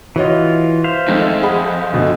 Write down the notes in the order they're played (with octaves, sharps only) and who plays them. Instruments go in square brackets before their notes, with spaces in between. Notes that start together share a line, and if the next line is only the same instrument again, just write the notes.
[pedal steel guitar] E3 F4 [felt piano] F#4 C#5 D#5
[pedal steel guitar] C5 E5 F5
[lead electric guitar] F2 [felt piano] D#3 G#3 A3
[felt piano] G#4 F#5 B5
D2 B2 A3